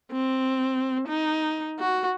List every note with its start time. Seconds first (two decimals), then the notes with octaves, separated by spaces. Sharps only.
0.12 C4
1.08 D#4
1.79 F#4